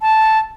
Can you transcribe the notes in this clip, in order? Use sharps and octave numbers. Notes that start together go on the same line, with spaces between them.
A5